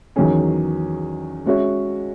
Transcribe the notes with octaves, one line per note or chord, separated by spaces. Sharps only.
E2 D#3 F#3 C#4 G#4
G#3 C#4 F#4 C#5 E5